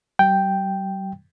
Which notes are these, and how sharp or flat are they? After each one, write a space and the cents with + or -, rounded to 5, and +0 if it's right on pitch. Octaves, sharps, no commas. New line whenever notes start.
G3 -45 G5 +0